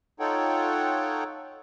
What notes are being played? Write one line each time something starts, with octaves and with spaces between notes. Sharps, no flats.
D#4 F4 A4 C#5 F#5 G5